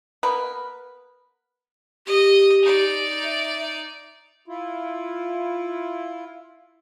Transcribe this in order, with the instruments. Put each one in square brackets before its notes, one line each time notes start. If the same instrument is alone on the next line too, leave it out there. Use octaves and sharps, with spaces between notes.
[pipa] A#3 B3 A#4 B4
[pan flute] G4 [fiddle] D#5
[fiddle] D#4 D5
[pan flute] E5
[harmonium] E4 F4